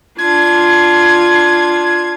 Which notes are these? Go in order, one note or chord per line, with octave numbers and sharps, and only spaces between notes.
D4 F4 G#6